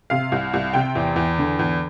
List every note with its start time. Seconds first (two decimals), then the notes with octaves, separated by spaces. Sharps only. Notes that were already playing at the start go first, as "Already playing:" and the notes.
0.10 C3 F5
0.32 C2
0.53 C2
0.73 C3 G5
0.95 E2
1.16 E2
1.38 D3
1.59 E2